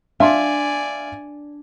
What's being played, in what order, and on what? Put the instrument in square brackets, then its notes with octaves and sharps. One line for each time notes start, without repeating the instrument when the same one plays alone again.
[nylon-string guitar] D4 [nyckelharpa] D5 G#5 [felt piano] E5 F5 C6